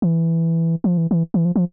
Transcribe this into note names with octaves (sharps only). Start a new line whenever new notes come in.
E3
F3
E3
E3
E3
F3
F3